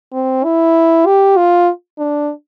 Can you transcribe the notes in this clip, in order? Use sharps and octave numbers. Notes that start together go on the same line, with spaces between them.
C4
E4
G4
F4
D4